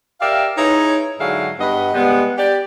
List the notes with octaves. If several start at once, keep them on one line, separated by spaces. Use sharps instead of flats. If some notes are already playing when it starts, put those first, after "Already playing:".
G4 A#4 D5 E5 F5
D#4 E4 G#4 B4 C#5
G#2 D3 F#3 E4 G#4 F5
G2 B3 B4 D#5
C3 G3 G#3 B3
G4 D5